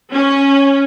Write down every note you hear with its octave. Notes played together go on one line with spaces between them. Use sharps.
C#4